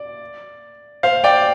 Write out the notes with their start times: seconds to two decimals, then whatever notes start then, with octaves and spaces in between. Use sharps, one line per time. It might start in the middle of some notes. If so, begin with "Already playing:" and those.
Already playing: D5
1.03 C5 F5
1.24 D5 G5